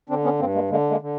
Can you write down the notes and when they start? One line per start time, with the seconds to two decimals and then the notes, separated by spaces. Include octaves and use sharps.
0.09 D3 C4 D4
0.24 B3 C#4
0.39 G2 A#3 C4
0.54 G#3 A#3
0.70 D3 G#3 A#3
0.90 G#3 A#3
1.01 D3